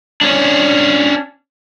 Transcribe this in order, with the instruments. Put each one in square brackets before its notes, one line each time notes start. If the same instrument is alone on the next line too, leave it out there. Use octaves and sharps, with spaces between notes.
[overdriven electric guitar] C#4 D4